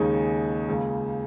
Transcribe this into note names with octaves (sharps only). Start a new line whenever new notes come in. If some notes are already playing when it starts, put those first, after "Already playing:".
Already playing: D#2 C#3 G#3 D#4
C#2 C#3 A#3